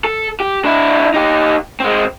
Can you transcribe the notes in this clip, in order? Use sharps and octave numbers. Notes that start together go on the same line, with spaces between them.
A4
G4
D4 E4
D#4 G4
G#3 C4